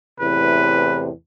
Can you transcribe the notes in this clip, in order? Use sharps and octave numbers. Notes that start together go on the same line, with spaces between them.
E2 A2 C3 B4